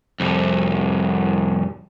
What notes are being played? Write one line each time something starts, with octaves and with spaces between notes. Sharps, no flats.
C2 F2